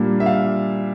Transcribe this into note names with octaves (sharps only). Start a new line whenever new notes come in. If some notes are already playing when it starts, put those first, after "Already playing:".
Already playing: A#2 G3 A#3 D4
E5
F5